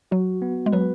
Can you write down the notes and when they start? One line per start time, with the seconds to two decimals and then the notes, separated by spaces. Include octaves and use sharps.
0.11 F#3 F#4
0.42 B3
0.66 G#3
0.72 F#3 B4